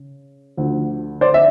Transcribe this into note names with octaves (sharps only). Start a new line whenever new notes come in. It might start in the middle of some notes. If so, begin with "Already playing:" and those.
Already playing: C#3
D2 D3 F3
C5 D5
E5